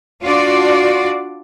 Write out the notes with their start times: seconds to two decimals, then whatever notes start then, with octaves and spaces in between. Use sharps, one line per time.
0.22 D4 F4 F#4 D5